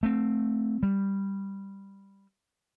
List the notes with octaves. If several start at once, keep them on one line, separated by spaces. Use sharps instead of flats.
A3 C4
G3